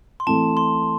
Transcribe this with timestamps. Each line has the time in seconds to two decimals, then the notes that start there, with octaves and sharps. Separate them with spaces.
0.20 C6
0.27 E3 A3 C4 E4 A5
0.57 C6